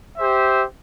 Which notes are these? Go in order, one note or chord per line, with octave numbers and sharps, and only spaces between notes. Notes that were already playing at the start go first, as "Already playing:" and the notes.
G4 C5 E5